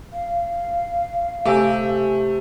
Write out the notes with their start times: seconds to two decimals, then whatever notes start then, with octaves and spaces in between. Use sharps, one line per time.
0.13 F5
1.45 C3 A3 G4 E5 G#5 D6 E6